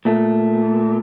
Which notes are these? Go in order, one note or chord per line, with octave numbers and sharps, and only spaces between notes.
A#2 A3